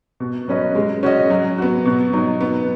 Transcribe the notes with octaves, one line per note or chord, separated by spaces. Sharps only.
B2
F#3 C#4 B4 D#5
G#3
C#4 F#4 D#5
F#3
B3 F#4
B2
F#3 D#4
B3